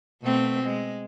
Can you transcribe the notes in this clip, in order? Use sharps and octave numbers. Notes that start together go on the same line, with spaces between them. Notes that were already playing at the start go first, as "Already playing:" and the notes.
B2 A3 C4
G#3